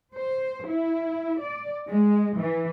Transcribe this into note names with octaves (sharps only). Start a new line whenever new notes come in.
C5
E4
D5
G#3
E3